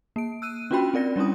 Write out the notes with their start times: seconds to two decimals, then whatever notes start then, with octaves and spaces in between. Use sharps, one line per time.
0.16 A#3 D7
0.42 E6 F#6 D#7
0.71 C#4 D4 F4 F#4 G5 B5
0.94 C4 A#4 D5 A#6
1.16 G3 C#4 D4 E4 D#6